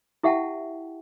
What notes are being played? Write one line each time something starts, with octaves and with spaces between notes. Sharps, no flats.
E4 G4 E5 F#5 G5 A5